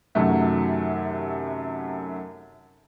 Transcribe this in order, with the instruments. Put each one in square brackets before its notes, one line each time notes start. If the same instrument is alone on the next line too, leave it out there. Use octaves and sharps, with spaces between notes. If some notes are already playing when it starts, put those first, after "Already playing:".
[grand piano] F#2 C3 D#3 F#3 A3 F#4